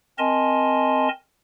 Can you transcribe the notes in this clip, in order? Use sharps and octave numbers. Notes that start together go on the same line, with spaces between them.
C4 A#4 D#5 G#5 A5 C6